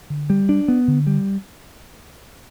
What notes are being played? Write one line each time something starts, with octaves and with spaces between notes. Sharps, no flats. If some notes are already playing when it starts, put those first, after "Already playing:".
D3
G3
D4
B3
D3
G3